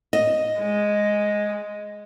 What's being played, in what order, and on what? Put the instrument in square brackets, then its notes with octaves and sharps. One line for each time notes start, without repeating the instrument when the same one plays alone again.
[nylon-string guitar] D#5
[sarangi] G#3